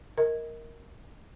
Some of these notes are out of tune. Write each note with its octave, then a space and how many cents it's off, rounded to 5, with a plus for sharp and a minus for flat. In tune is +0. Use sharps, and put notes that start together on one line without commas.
A#4 +0 D#5 +30